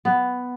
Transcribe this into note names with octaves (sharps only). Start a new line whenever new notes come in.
B3